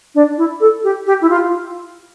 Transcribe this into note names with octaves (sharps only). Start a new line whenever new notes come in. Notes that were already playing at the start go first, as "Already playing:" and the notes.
D4
E4
A4
G4
G4
E4
F4